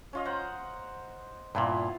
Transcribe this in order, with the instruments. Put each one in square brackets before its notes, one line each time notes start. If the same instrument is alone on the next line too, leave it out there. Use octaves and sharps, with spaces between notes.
[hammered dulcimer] C#4 F4 D#5
C5 F#5 A#5
[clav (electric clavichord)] G2 A#2 [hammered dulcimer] B3 E4 F4